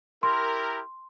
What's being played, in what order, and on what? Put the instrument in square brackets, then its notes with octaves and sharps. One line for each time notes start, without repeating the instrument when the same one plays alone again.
[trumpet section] E4 G4 A#4 [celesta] C6